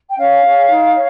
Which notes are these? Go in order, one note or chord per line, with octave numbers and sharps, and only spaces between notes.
G5
C#4 C#5 F5
G#4 C#5
D#4
C#5